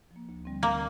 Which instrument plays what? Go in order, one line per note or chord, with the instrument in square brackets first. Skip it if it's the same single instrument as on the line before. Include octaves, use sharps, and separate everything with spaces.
[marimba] F3
A#3
D2
D3 G3 C4
[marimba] D2 [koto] A#3